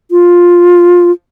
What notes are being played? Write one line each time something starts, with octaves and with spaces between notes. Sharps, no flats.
F4